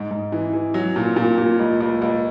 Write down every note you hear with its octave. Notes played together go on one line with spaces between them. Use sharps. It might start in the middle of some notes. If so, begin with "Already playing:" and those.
Already playing: G#2
G#2
E3
E3
F#3
A#2
A#2
A#2
C#2
C#2
C#2